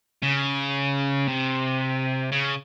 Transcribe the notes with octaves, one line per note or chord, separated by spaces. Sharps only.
C#3
C3
C#3